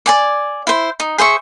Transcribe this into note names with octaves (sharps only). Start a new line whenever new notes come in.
D5 G#5 D6
E4 C5
D#4
G#4 C5 E5 C#6